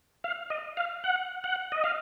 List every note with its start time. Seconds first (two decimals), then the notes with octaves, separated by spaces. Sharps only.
0.24 F5
0.50 D#5
0.77 F5
1.04 F#5
1.44 F#5
1.72 D#5
1.84 F5